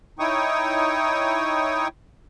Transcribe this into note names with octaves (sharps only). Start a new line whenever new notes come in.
D#4 E4 C#5 G5 C#6 D#6